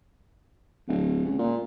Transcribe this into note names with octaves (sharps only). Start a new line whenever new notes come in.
D1
C#2
A#2